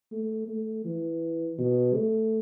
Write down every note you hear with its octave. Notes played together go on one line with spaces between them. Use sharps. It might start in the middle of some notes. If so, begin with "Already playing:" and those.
A3
A3
E3
B2
A3